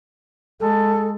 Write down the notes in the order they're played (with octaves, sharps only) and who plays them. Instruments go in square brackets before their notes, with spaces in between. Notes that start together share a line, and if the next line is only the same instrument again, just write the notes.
[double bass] G#3 [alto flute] A4